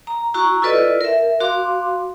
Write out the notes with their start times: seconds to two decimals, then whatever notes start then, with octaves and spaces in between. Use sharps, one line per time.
0.07 A#5
0.34 E4 F#4 A#5 C#6
0.62 E4 F4 A4 B4 D5 D#5
1.01 A#4 E5
1.40 F#4 F5 C6 D6